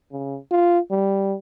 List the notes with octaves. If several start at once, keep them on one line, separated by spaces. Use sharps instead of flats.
C#3
F4
G3